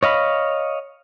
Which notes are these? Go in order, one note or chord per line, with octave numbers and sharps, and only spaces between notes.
C#5 D#5 F5 B5